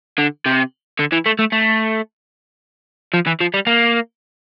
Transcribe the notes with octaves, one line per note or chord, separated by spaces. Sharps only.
D3
C3
D3
E3
A3
A3
A3
F3
E3
F3
G3
A#3